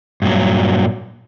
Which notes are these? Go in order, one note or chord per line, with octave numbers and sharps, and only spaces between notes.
G2 A#2 F#3